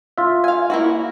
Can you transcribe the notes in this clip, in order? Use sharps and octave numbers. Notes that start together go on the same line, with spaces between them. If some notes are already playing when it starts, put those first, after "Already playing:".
F4 E5
F5 G#5
A#3 E4 F#4